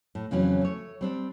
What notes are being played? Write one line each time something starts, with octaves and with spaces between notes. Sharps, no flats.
A2
F2 C#3 E3 F#3 C#4
A3 C#5
G3 C4 D4